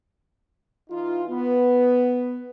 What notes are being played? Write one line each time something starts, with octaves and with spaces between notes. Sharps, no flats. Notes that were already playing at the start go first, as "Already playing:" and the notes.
E3 D#4 F4
B3